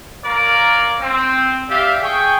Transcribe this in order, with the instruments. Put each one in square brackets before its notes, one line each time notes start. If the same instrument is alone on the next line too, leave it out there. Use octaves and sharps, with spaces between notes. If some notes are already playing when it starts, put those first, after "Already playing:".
[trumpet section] A#4 C#5 D5 F5
C4
G4 D5 E5 F5
G#4 G5 C#6